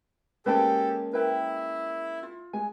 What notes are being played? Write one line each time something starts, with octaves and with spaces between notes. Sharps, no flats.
G#3 A#3 C#4 G4 A4 B4 G5 A5
E4 A#4 B4 G5
F4
G#3 G#5